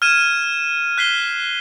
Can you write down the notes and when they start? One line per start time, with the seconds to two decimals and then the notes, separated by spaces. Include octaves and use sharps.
0.02 F6 G#6 D#7 E7
0.98 F#6 B6 C7 G7